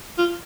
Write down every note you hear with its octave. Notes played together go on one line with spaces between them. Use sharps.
F4